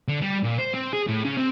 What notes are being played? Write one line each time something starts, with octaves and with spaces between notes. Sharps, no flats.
D3
G3
A#2
C5
C4
G#4
A2
C#3
C4